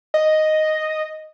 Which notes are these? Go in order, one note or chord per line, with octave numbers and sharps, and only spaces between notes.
D#5